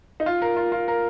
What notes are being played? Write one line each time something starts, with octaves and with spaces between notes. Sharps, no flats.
D#4
F4
A#4
F4
F4
A#4